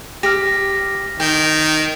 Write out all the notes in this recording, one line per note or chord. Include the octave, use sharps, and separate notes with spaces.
G4 F6 A#6
D#3 G5